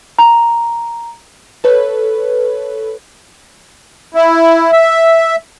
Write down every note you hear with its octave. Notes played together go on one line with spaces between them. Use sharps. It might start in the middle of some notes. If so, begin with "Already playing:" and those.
A#5
A4 B4 C#5
E4
E5